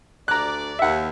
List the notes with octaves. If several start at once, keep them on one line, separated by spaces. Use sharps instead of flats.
D2 D5 A#5 F#6
D#2 E5 F#5